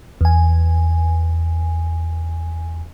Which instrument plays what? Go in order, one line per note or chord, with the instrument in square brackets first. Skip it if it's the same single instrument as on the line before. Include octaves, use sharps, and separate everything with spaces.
[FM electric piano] E2 G#5